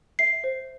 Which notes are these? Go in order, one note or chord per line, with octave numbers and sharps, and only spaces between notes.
E5 C7
C5